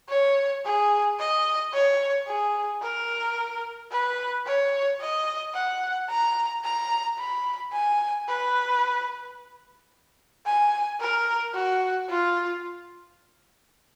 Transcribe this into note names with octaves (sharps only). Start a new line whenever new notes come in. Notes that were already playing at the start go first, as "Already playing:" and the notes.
C#5
G#4
D#5
C#5
G#4
A#4
B4
C#5
D#5
F#5
A#5
A#5
B5
G#5
B4
G#5
A#4
F#4
F4